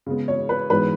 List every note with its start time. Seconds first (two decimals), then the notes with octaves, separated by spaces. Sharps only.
0.06 C#3 G#3 B3
0.28 C#5
0.49 B4
0.70 G#2 E3 G#3 B3 B4